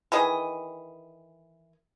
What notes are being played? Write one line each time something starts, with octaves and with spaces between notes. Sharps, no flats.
D#3 E3 G#4 D#5